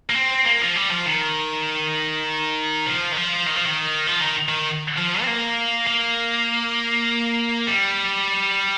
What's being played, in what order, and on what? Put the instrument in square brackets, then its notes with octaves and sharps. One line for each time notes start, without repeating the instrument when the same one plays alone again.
[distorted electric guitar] A#3
C4
A#3
F3
G3
F3
D#3
F3
D#3
F3
D#3
F3
D#3
F3
D#3
D#3
F3
C4
A#3
A#3
G3